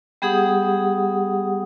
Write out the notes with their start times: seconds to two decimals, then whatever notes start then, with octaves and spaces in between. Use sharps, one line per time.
0.22 G3 B3 G4 G#4 F#5 D#6